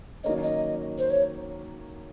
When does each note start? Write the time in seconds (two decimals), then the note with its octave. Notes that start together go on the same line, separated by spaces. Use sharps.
0.24 D#3 F#3 A#3 C#4 D#5
0.43 D#5
0.98 C5
1.10 C#5